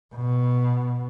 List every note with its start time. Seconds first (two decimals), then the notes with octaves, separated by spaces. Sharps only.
0.15 B2